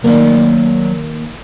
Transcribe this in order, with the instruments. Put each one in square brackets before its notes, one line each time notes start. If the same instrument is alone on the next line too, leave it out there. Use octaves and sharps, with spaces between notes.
[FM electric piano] D#3 A#3 [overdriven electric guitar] F#3 D5